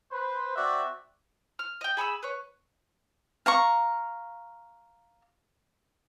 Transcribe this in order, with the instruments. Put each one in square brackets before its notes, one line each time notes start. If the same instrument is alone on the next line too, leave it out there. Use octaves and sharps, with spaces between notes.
[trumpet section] B4 C5
C4 F#4 D5 E5
[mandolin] F6
D#5 G5
G#4 B5 C#6 E6
B4 C#5
[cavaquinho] F5 A#5 C#6